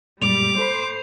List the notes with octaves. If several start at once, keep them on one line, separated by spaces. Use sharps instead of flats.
F#2 A#2 G3 G#3 D6 F7
A4 C5 B5